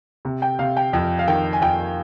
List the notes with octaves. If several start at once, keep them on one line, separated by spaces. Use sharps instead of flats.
C3
G5
C3 F5
G5
F2 G5
F5
D#3 G5
G#5
F2 G5